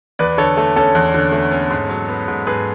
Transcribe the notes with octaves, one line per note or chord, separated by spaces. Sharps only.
E2 B4 D5
D3 A4 C#5
A3 A4
C#4 A4
E2
D3
A3
C#4
G#2
F#3
B3
G#2
G#2 G#4 B4